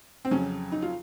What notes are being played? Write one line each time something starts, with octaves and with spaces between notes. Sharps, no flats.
C4
F2 C#3 F#3 C#4
D#4
F4